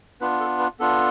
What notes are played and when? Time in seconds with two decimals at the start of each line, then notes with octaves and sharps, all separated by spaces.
0.21 B3 D4 F4 B4
0.40 A4
0.59 B4
0.80 B3 D4 F4 A4